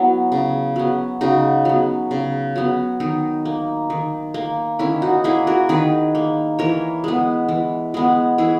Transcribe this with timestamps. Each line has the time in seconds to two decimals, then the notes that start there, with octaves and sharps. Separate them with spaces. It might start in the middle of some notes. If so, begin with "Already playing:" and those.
Already playing: F#3 B3 E4
0.32 C#3
0.76 F#3 B3
1.21 C#3 D#4 F#4
1.65 F#3 B3
2.11 C#3
2.56 F#3 B3
3.00 D#3 D#4
3.45 A#3
3.90 D#3
4.34 A#3
4.79 D#3 C#4 E4
5.02 D#4 F#4
5.24 A#3 E4 G#4
5.47 F#4 A#4
5.69 D#3 G#4 B4
6.15 A#3
6.59 E3 A#4 C#5
7.04 G#3 B3
7.49 E3
7.94 G#3 B3
8.38 E3 E4 G#4